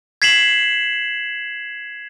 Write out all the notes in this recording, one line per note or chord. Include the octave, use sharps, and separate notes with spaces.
G#6 B6 C7 E7 F#7